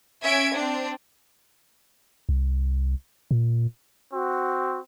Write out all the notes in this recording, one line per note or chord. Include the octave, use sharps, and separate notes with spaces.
C#4 E5 G#6 D7
C4 D4
C2
A#2
C4 F#4